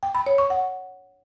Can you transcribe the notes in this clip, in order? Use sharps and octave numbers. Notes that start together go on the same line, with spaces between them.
G5
B5
C#5
C#6
F#5